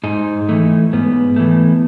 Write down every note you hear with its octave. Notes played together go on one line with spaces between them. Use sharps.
G#2 D#4
E3 A3
G#2 B3
E3 A3